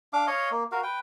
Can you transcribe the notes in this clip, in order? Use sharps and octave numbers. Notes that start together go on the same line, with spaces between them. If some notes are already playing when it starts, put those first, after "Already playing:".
D4 F5 D6
C#5 D#5 F5
A#3
F#4 A#4 F5
B4 G5